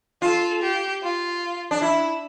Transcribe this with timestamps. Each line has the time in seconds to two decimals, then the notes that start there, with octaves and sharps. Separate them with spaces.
0.22 F4 A4
0.62 G4
1.02 F4
1.71 D4
1.82 E4